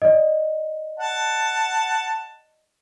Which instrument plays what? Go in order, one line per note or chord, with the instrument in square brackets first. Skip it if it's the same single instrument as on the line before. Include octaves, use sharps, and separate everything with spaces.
[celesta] D5 D#5
[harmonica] F#5 A5